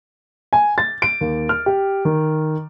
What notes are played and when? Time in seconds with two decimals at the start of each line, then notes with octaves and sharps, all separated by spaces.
0.53 G#5
0.78 A6
1.02 D7
1.21 D#2
1.49 F6
1.66 G4
2.05 D#3